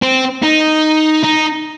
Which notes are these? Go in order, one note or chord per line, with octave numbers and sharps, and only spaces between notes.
C4
D#4
D#4